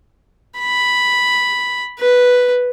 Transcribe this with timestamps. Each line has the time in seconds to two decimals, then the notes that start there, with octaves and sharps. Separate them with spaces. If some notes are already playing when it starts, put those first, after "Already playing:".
0.59 B5
1.99 B4